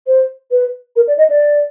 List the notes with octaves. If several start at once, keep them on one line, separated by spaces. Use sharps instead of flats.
C5
B4
A#4
D5
D#5
D5